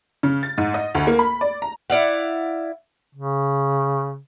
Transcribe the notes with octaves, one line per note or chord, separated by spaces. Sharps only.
C#3
A6
G#2
D#5
D2
A#3
B5
D5
A#5
E4 D5 F5 F#5
C#3